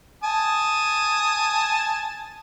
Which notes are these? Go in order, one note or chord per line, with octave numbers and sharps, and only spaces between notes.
G#5 A5 D#6